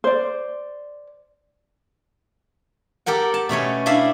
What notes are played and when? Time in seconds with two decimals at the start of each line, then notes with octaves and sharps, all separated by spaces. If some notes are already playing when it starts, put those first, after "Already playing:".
0.04 C5 D5
3.06 G4 A4 A#4 F#5
3.34 A5
3.49 B2 A3 C#4 C#5
3.86 D4 E4 E5 F5